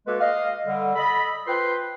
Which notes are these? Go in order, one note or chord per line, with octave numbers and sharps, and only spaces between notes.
G#3 A#3 F#4 A4 B4
D#5 F5
D3 G3
A4 D#5 B5
F4 B4 C5 G5 C6